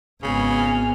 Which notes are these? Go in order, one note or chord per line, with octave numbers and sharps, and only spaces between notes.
G#1 C#3 B3 G#5 F6